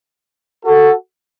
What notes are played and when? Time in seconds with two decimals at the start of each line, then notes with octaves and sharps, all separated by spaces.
0.66 F#4 A4